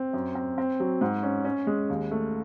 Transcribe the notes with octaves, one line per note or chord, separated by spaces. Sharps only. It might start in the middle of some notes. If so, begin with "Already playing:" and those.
Already playing: C4
F#2
C4
C4
F#3
G#2
C#4
C#4
G#3
D#2
A3